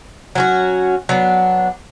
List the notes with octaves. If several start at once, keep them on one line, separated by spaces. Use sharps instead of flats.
F#3 C#4 F#4
F#3 B3 D4